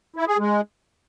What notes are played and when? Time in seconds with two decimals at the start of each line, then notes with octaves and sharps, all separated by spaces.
0.16 E4
0.27 G#4
0.39 G#3